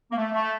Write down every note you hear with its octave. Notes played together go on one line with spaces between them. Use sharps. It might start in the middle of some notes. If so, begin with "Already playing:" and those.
A#3
A3
A3